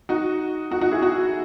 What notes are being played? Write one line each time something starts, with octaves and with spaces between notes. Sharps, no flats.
D#4 F#4
D#4 F#4
D#4 F#4
E4 G#4
D#4 F#4